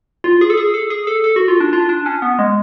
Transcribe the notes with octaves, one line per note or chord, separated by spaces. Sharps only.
F4
G#4
A4
G#4
A4
G#4
A4
A4
F#4
F4
D4
F4
D4
C#4
B3
G#3